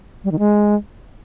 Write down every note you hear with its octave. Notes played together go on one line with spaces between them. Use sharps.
G3
D#3
G#3